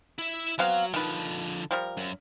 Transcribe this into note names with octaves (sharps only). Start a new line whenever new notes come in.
E4 E5
F#3 B3 C4 F5
D3 D#3 F3 B4
F3 G3 A#4
F#2